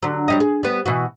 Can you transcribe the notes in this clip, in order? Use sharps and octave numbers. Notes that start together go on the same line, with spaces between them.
D3 F#3
F#3 G3 D#5
G#4
G3 B3
B2 E3 F#4